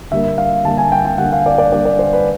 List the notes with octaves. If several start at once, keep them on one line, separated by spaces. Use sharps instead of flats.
D3 G3 A#3 E5
F5
D3 G3 A#3 A5
G#5
G5
G5
D3 G3 A#3 F#5
F5
D5
D5
D3 G3 A#3 D5
D5
C5
B4